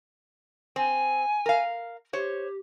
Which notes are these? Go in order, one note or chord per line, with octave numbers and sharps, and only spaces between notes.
C4 G#5
A#4 F5
G4 C5 C#5